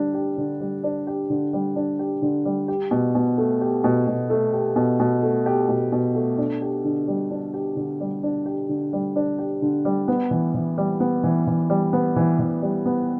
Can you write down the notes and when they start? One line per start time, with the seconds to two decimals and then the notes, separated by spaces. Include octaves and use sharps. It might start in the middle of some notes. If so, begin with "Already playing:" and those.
Already playing: D3 G3 D4
0.14 G4
0.37 D3
0.61 G3
0.84 D4
1.07 G4
1.30 D3
1.53 G3
1.76 D4
1.99 G4
2.22 D3
2.45 G3
2.68 G4
2.91 B2
3.15 B2
3.38 A3
3.61 G4
3.84 B2
4.07 B2
4.30 A3
4.53 G4
4.76 B2
5.00 B2
5.23 A3
5.46 G4
5.69 B2
5.92 B2
6.15 A3
6.38 D4
6.62 G4
6.85 D3
7.08 G3
7.31 D4
7.54 G4
7.76 D3
8.00 G3
8.23 D4
8.46 G4
8.69 D3
8.93 G3
9.16 D4
9.39 G4
9.62 D3
9.85 G3
10.08 B3
10.31 E3
10.54 E3
10.78 G3
11.00 B3
11.24 E3
11.47 E3
11.70 G3
11.93 B3
12.16 E3
12.39 E3
12.62 G3
12.86 B3